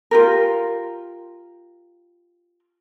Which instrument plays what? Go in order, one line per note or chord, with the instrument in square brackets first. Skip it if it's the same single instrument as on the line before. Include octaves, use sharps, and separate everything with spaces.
[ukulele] F4 G4 A#4